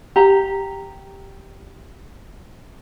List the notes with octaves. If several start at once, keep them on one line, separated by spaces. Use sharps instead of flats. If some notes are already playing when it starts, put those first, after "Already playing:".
G4 A#5